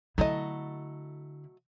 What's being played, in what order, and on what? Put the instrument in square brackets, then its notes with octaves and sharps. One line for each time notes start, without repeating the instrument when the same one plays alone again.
[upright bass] D3 E4 [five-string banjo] F#3 A3 D#5